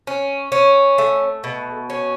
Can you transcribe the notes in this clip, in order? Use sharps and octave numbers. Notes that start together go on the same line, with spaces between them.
C#4
C#4
A3
B2
C#4